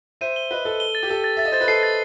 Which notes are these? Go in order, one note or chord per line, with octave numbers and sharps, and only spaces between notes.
C5 E5 D#7
G7
B4 D#5 G7
A4 G7
G7
A6
G4
A4 G7
A6
E5 A6
D#5
C5 A6
B4
A4 C7
A6